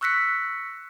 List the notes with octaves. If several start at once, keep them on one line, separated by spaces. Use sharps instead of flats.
C#6 E6 F#6 A#6 B6 C#7